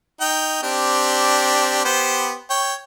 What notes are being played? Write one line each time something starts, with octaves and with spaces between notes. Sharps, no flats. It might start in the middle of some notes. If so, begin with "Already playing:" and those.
D#4 G5
C4 D4 G4
B3 G4 C5
C#5 G5